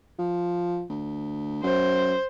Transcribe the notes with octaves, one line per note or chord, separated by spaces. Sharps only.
F3
D2
F#2 C5